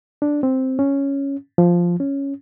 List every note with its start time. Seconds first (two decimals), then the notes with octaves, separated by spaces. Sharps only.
0.22 D4
0.43 C4
0.79 C#4
1.58 F3
2.00 C#4